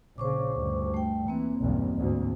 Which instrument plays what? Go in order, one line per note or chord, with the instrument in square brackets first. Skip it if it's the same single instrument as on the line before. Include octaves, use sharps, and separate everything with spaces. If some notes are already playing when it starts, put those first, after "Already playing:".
[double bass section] A#1 C#3 [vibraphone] C5 C#6 D6
[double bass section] D2 G2
[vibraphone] A3 G5
[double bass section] E3 [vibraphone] A#3 C4
[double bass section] B1 E2 G2
D2 G#2